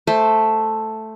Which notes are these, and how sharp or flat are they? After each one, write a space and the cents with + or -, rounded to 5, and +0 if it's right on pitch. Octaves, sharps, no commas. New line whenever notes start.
A3 +0 C5 +0